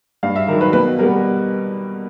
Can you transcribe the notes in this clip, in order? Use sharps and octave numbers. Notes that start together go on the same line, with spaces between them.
G2 F5
E5
D#3 F#3 A#4
B4
B2 B4
G3 B3 A#4